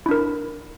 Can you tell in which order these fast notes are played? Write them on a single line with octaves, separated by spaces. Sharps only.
E4 D4 A#4